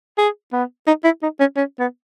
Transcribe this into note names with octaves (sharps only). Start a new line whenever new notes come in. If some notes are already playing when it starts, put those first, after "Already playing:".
G#4
B3
D#4
E4
D#4
C#4
C#4
B3